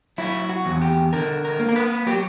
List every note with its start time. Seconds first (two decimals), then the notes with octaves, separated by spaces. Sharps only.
0.18 F#3 E4
0.49 F#4
0.65 E2
0.82 G4
1.13 D3 A#4
1.45 A#4
1.60 A#3
1.69 A#4
1.76 B4
2.07 F#3 G4